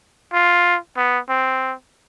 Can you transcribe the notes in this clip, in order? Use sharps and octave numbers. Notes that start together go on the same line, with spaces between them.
F4
B3
C4